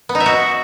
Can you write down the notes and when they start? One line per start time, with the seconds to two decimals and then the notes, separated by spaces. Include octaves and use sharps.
0.09 B3
0.15 D#4
0.20 E5
0.26 F#4